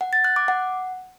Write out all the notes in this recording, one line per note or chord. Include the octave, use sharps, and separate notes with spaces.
F#5
A6
F#6
D6
F#5